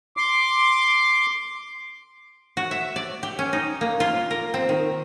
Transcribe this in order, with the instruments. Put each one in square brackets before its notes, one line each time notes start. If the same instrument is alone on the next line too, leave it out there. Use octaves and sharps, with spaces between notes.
[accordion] C6 D6
[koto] F#4
E5
D5
G4
C#4
D#4
A#3
F4
A#4
C4
D#3